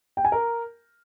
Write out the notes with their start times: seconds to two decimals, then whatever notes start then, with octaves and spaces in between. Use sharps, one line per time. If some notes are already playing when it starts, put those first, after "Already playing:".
0.17 G5
0.25 G#5
0.32 A#4